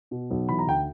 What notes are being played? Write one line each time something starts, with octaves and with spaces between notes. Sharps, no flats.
B2
B1
E3 B5
A#5
D2 G5